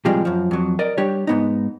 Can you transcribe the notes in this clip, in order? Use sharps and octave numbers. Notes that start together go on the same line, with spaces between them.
A2 C3 F3 G3 G#3
F#2 F3
F2 F#3
A#4 D5 D#5
G3 D4 G4 C#5
G#2 B3 D#4